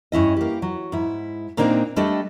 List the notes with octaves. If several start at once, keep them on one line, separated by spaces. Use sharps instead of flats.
G2 C#4 E4 D#5
A#3 G4
F#3
G#2 E4
A#2 A#3 C4 D4 D#4 A#5
G3 A3 D4 G4 A4 D#5